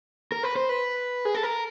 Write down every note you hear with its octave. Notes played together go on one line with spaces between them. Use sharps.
A#4
B4
C5
B4
G#4
A4
A#4